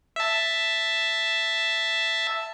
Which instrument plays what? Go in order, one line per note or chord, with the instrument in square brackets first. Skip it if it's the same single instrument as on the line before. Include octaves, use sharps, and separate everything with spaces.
[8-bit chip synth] E5 A5